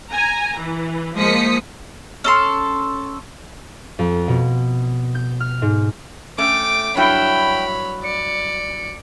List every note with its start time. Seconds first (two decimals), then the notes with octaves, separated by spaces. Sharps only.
0.12 G#5 A#5
0.57 E3
1.16 F3 G#3 A#3 D#6 B6 C#7
2.24 C#4 A4 C6
3.99 F2
4.28 B2
5.15 G6
5.40 F6
5.62 G#2
6.38 A3 C#4 G5 D6
6.97 G2 F#3 E4 C#5 G5 B5
8.04 D5 C#7